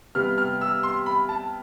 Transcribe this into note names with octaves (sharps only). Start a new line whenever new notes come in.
C3 G3 B3 F6
F6
E6
C6
B5
A5